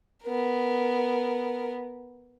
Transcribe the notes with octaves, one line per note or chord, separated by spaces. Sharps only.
B3 A#4